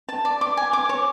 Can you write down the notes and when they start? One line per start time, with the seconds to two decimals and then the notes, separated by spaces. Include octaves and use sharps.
0.09 A5
0.25 D5
0.41 D6
0.57 G#5
0.73 D6
0.89 C#5